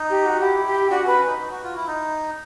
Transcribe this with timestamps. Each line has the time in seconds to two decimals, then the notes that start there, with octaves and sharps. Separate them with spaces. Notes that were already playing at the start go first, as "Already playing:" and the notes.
Already playing: D#4
0.10 G4
0.26 F#4
0.41 E4 G4
0.66 G4
0.90 D4 F#4
1.03 C#4
1.07 B4
1.14 C#4
1.26 D#4
1.39 D#4
1.51 F#4
1.64 F4
1.75 E4
1.87 D#4